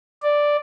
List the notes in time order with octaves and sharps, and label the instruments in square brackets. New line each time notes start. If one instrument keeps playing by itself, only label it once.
[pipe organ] D5